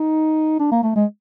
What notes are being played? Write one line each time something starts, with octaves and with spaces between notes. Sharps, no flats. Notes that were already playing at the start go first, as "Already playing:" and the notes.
Already playing: D#4
D4
A#3
A3
G#3